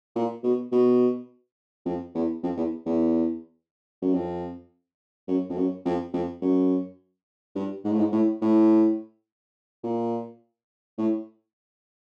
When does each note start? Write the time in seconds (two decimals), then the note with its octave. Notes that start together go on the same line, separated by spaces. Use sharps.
0.16 A#2
0.44 B2
0.72 B2
1.86 F2
2.15 E2
2.43 F2
2.57 E2
2.86 E2
4.02 F#2
4.14 F2
5.28 F#2
5.50 F2
5.57 F#2
5.85 F2
6.14 F2
6.42 F#2
7.55 G2
7.85 G#2
7.91 A2
7.99 G#2
8.12 A2
8.41 A2
9.83 A#2
10.98 A2